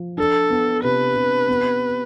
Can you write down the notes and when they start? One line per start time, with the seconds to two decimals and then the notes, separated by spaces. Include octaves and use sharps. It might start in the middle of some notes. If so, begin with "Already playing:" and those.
Already playing: F3
0.18 D4 A4
0.50 B3
0.83 C3 B4
1.16 C3
1.48 B3